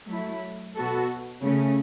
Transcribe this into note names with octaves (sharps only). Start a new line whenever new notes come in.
F#3 A3 E4
B2 B3 F#4 A4
C#3 A3 C#4